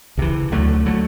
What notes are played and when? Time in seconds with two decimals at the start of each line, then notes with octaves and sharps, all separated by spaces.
0.17 C#2 C3 E3
0.52 D2 D3 F#3 A3
0.86 D3 F#3 A3